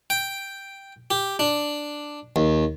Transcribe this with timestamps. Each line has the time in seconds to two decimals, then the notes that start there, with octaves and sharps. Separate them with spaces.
0.10 G5
1.11 G4
1.39 D4
2.36 D#2